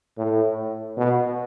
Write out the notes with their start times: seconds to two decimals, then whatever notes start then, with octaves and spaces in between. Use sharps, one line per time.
0.18 A2
0.97 B2